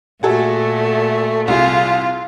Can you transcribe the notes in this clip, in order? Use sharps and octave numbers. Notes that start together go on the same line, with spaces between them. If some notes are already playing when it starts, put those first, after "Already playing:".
A#2 A3 F#4 G#4 A4
C2 F4 G#4